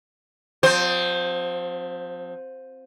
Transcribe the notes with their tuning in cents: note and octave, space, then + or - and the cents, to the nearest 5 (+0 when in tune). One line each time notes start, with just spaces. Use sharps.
F3 +35 C4 +0 C5 +0